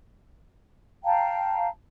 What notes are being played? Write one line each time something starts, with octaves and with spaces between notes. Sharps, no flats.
F5 G5 A5 A#5